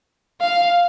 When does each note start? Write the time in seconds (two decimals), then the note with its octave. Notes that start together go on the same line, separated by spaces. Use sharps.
0.41 F5